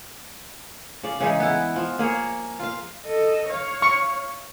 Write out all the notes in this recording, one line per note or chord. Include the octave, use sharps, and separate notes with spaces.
C#3 D5
C#3 E3 G#3 D#4
B3 E4
F3
A#3 G#4 A#4 C#5
F4 F5
A4 D#5
C#5 F5
C#6